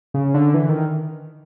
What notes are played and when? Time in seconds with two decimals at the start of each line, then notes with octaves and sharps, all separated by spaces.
0.14 C#3
0.34 D3
0.54 E3
0.69 D#3